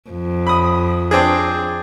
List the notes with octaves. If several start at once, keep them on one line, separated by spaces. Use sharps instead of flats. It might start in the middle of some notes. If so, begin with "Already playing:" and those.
F2
B5 D#6
C4 D4 G#4